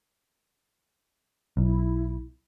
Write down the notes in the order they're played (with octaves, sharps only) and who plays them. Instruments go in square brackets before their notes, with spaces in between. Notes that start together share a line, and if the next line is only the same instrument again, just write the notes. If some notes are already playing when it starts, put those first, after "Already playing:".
[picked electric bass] B1 [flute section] E4